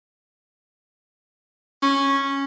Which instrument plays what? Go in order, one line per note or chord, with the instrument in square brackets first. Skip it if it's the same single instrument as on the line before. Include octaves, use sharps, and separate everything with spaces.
[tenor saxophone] C#4